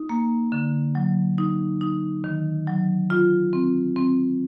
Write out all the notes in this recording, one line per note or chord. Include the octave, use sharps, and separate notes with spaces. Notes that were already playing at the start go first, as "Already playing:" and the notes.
Already playing: D#4
A#3
D3
F#3
D#4
D#4
D#3
F#3
F4
C4
C4